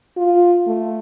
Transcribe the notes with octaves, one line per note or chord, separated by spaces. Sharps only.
F4
A3